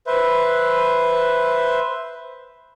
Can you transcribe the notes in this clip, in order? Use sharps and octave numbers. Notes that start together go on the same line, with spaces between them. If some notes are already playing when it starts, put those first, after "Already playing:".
B4 C5 E5